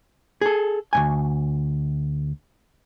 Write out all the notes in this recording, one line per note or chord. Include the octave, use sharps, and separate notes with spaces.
G#4 A4
D2 G2 G#5